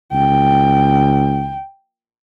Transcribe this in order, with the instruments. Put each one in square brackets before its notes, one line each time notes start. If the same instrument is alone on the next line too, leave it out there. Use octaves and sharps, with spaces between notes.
[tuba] C#2 [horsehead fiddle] G5